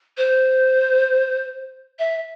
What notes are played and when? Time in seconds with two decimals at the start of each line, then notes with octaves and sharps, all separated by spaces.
0.17 C5
1.99 E5